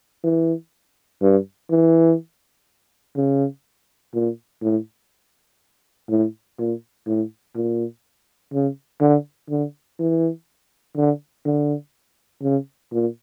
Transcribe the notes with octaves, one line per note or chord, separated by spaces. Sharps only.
E3
G2
E3
C#3
A#2
A2
A2
A#2
A2
A#2
C#3
D3
D3
E3
D3
D3
C#3
A#2